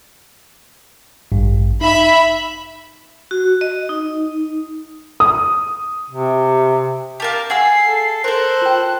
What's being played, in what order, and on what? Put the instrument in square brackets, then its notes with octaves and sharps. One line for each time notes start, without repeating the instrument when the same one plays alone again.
[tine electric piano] A1 G2
[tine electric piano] D#4 [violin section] E5 B5
[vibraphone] F#4
D#5
D#4
[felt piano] D#6
[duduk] C3
[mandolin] G4 A#4 F5 [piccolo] A5
[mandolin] G#4 E6 [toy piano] F5 F#5 G#5 [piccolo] C7
[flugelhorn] A4
[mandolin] A4 A#4 [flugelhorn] C5 [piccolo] F#6
[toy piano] F4 G5